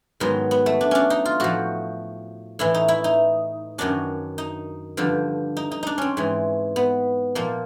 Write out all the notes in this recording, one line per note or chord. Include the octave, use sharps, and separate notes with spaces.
G#2 D#3 F#3 B3
B3
A3
D4
C#4 D4
D#4
F4
A2 F3 F#4
A2 E3 E4
D#4
E4
D#4
F#2 D#3 F#3 D4
D#4
G2 D3 F3
D#4
D#4
D4 D#4
C4 C#4
G#2 E3
B3
A#2 F3 A#3